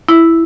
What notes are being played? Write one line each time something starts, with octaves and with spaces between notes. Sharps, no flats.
E4